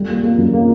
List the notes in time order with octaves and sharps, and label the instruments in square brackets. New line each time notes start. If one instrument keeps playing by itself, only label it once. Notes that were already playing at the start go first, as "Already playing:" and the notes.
Already playing: [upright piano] G3 A3
A#3
A#3
F#2
A#3